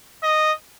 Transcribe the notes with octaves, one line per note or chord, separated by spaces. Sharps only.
D#5